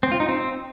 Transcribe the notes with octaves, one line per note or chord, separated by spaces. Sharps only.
C4
F4
D#4
C4